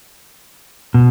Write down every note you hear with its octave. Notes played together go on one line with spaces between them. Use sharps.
B2